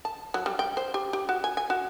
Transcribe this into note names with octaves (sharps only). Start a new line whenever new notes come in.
A5
F#3
G3
G5
C5
G4
G4
F#4
G#5
G#5
F#4